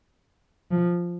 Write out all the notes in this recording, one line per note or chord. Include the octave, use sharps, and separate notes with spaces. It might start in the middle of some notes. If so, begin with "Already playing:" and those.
F3